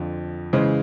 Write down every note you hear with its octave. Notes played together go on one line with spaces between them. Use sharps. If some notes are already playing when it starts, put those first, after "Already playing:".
Already playing: F2 D3 F3
C#3 E3 G#3 C5